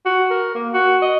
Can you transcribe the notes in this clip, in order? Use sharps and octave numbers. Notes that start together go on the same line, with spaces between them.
F#4
A#4
A#3
F#4
D#5